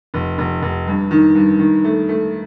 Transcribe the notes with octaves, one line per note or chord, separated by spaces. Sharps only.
F1
F1
F1
G2
D#3
G2
D#3
A3
A3